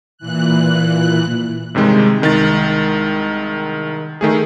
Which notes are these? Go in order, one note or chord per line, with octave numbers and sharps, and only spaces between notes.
A#2 E3 F#6
G2 C3 D#3 G#3
C2 D#3 G#3 A6
D#3 A3 G#4